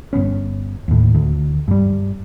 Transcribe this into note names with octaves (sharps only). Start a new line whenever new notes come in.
G1 B2 B3 C#4
D#2 A2
D2
G2 G3